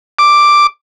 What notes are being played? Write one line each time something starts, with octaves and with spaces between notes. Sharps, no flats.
D6